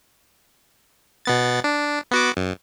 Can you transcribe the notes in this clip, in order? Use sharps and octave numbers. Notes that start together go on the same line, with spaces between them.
B2 B3 A6
D4
B3 F#4 D6
F#2